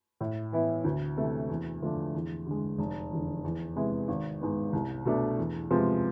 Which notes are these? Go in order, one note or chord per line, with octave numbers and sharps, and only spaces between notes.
A2
E3 B3 E4
D2
C3 E3 A3
E2
D3 F3 A3 D4
E2
D3 G#3
F1
E2 D3
E2
C3 G#3 B3 E4
G#1
G#2 G#3 B3
C2
B2 A3 D4
E2
C3 F3 G#3 B3